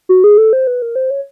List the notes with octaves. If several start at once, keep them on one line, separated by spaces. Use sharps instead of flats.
F#4
G#4
A4
C5
B4
A#4
C5
C#5